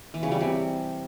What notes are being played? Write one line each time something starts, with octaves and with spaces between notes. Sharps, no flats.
E3
C#3
G3
C3